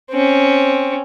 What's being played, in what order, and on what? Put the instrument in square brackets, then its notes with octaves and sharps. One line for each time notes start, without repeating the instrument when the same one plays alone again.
[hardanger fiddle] C4 C#4